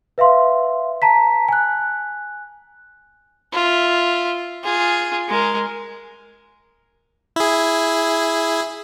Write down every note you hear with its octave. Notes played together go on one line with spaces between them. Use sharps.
B4 E5 F5 C6
A5 A#5 B6
G#5 F#6
F4 E5
F4 G#4
G#3 A#4
E4 G#4